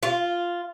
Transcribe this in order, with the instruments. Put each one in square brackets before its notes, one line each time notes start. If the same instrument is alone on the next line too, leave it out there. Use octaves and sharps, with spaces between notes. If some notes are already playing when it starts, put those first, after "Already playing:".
[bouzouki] F4